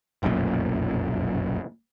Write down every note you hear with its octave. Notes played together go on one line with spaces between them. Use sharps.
F1 B1 F#2 A#2